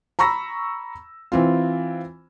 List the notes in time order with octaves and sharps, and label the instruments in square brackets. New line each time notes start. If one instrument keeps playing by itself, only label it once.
[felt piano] A#5 B5 C#6 E6 A#6
E3 C4 F4